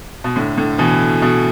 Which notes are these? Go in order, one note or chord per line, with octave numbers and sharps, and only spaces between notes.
B2
A2 D3
A2 D3
B2 E3
B2 E3